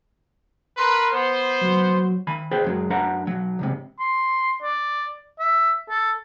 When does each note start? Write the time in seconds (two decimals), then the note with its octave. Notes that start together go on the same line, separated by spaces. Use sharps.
0.78 A#4 B4 C6
1.12 B3 C5
1.61 F#3
2.27 D#3 G#5 B5
2.51 G#4 B4 C5 G5
2.64 F#2 F#3 G#3
2.90 F#2 D4 B4 E5 F#5 A#5
3.27 B1 F#3
3.59 C#2 G#2 C3
3.99 C6
4.62 D5
5.39 E5
5.89 A4